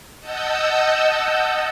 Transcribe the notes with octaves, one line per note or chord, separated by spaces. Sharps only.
D#5 F#5 A5 E6 G6